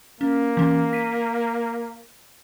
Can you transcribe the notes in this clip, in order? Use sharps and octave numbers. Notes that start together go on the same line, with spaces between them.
A#3 C#4
E3 C#4
B6 D#7